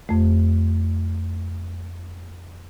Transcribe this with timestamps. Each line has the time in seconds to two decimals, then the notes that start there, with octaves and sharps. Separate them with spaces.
0.09 F2 A3